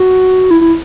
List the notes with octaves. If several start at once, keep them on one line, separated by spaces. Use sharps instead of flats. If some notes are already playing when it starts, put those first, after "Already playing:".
Already playing: F#4
E4
E4